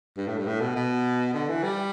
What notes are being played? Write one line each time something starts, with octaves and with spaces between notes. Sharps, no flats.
G2
A2
G2
A2
B2
B2
D3
E3
G3